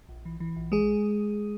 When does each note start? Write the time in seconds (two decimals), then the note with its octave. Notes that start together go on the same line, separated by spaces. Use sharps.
0.09 A#1
0.25 E3
0.40 E3
0.56 A#1
0.72 G1 G#3 G#4